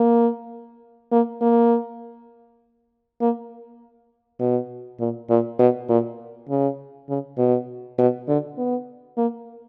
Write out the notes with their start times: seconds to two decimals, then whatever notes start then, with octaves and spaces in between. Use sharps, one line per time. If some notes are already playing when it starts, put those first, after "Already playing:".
Already playing: A#3
1.12 A#3
1.41 A#3
3.21 A#3
4.40 B2
5.00 A#2
5.30 A#2
5.59 B2
5.89 A#2
6.49 C#3
7.09 C#3
7.38 B2
7.98 B2
8.28 D3
8.58 B3
9.17 A#3